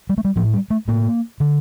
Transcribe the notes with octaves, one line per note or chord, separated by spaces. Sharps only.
G3
A3
G3
A2 F3
G3
A3
A2 A#3
D3